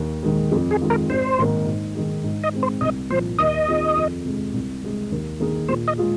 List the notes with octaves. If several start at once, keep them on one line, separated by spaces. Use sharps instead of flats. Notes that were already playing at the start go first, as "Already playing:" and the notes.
Already playing: D#2
D#3 G#3
F2 G#3
G#4
D#3 G#3 F4
A#4
G#1 C5
G#2 D#3 A#3
G#2
D#3 G#3
G#2
D#5
G#3 C4
C5
C2 D#5
A#2 F3 C5
D#2 D#5
D#3 C4 F4 G#4
F2
C3 G#3
C2
C3 G#3
D#2
D#3 A#3 G#4
A#2 C5
D#5
G#3 F4 G#4